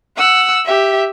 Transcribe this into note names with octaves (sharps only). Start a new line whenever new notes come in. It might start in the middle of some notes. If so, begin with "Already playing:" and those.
F#5 E6
G4 E5